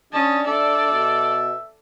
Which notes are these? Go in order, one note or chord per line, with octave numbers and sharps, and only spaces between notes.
C#4 D4 D#5 A5
A4 D5 E5
B2